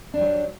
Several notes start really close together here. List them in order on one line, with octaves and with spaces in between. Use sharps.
D4 G3 F#3